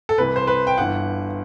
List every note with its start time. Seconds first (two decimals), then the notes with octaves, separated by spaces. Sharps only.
0.09 A4
0.18 C2 C3 E3 B4
0.36 C5
0.47 B4
0.67 G5
0.78 G1 G2 E3 F#5